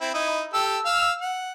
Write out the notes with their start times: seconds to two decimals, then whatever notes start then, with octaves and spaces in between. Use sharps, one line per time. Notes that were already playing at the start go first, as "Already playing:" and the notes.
0.01 C4 E4
0.14 D#4 E4
0.54 G4 A4 E6
0.86 F5 E6 F6
1.21 F#5